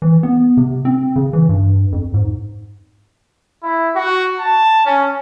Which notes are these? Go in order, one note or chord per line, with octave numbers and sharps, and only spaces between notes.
E3
B3
C3
C4
C#3
E3
G2
F2
G#2
E4
F#4
A5
C#4